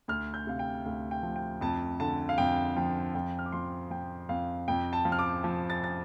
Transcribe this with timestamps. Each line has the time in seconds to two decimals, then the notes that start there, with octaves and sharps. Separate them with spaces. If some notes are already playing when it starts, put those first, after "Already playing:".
0.08 D2 F6
0.34 G6
0.47 C3 F5
0.59 G5
0.86 D2 F5
1.11 G5
1.23 F3
1.36 G5
1.61 F2 A5
2.00 D3 A5
2.29 F5
2.38 F2 G5
2.76 F3 G5
3.15 F2 G5
3.39 F6
3.46 D6
3.52 F3 C6
3.90 F3 G5
4.29 F2 F5
4.68 F2 G5
4.93 A5
5.05 F3
5.12 F6
5.19 D6
5.44 F3
5.70 A6
5.84 A6